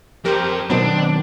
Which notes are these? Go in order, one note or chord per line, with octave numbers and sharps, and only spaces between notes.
F2 G4 A#4 C5
B2 D#3 F#3 B3 C4 D4